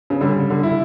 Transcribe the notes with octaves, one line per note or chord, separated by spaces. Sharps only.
C#3
D3 G3
D3
E4